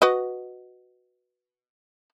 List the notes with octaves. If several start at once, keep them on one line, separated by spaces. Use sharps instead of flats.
F#4 B4 D#5